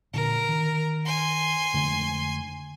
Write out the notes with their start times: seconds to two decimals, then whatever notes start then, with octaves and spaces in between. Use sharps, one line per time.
0.14 A#2 D3 A#4
0.49 D#3
1.05 G#5 C6
1.74 F2 D3 A3